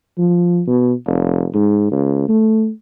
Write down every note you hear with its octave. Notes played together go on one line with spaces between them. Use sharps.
F3
B2
F1
G#2
C#2
A3